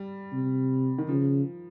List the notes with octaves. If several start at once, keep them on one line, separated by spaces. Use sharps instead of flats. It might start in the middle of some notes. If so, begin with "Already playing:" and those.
Already playing: G3
C3
D#3
C#3 F3